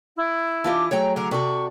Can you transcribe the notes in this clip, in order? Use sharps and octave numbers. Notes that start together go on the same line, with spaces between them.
E4
E3 D4 F4 G4 D#5
F#3 A3 G#4 C#5 G5 A#5
D3 A#4
C3 F#4 A4 D5 C#6